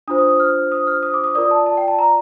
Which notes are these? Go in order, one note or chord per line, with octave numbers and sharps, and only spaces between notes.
D4 F4 C5 D#6
D#6
D#6
F6
D#6
F6
D#6
D6
D#6
F4 A#4 D5 D#6
A5
A5
G5
A5
A#5